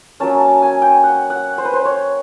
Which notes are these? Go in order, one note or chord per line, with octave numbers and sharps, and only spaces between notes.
F#3 A#3 C#4 A5
A5
G#5
G5
F#5
F#5
C5
B4
C5
C#5